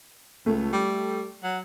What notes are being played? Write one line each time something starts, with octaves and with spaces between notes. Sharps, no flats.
C#2 A3
G3
F#3